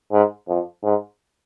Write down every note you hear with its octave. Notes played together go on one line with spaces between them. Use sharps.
G#2
F2
G#2